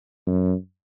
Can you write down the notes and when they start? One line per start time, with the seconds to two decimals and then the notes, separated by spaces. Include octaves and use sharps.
0.27 F#2